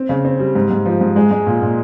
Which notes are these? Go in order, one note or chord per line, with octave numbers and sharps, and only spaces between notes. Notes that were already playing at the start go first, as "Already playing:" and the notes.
Already playing: C4
C#3
C4
G3
G#2
G#2
F3
G#2
G#3
G#3
A#2
A#2